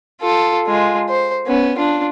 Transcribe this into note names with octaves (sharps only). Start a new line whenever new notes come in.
F4 A4
G#3 F4
C5
B3 C#4
D4 F4